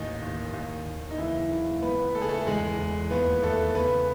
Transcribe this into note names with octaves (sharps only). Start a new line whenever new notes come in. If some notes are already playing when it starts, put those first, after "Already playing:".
Already playing: A1 D#2 D#3 D#4
D#2
D#2
D#2
D#4
F#1 E3 E4
F#1
C#2 B3 B4
C#2 A4
G#4
A3 A4
E2 G#3 G#4
E2
D#2 B3 B4
D#2 A3 A4
C#3 B3 B4